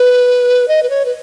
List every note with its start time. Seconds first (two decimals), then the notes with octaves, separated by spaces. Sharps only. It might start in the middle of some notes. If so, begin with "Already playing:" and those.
Already playing: B4
0.68 D#5
0.83 B4
0.90 C#5
1.05 B4